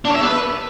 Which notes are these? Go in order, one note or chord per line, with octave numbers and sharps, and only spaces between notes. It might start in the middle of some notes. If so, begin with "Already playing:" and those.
D4
C#5
E5
B3
B4